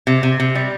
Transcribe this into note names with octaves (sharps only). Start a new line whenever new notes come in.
C3
C3
C3
G3